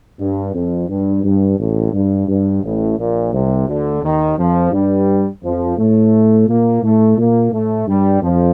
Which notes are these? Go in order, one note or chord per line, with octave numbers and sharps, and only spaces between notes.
G2
F2
G2
G2
A1 A2
G2
G2
A1 A2
A#1 A#2
C2 C3
D2 D3
D#2 D#3
F2 F3
G2 G3
F2 F3
A2 A3
A#2 A#3
A2 A3
A#2 A#3
A2 A3
G2 G3
F2 F3